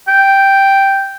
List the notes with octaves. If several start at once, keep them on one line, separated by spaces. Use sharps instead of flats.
G5